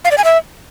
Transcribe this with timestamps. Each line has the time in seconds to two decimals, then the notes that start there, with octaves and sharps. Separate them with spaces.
0.05 F5
0.11 D5
0.18 G#5
0.24 E5